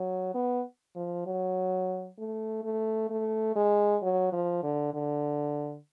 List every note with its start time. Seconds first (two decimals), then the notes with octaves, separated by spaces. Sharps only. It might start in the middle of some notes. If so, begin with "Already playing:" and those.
Already playing: F#3
0.35 B3
0.96 F3
1.27 F#3
2.19 A3
2.64 A3
3.10 A3
3.56 G#3
4.02 F#3
4.33 F3
4.63 D3
4.94 D3